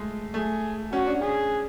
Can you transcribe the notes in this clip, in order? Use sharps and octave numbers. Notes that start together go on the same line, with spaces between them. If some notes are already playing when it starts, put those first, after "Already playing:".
Already playing: G#3 A3
A3 G#4
C#4 F#4
D4
C#4 G#4